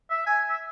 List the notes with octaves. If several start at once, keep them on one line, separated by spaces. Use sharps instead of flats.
E5
G#5
E5